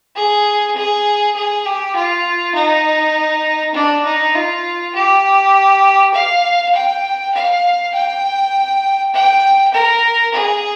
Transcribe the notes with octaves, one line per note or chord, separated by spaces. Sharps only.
G#4
G#4
G#4
G4
F4
D#4
D4
D#4
F4
G4
F5
G5
F5
G5
G5
A#4
G#4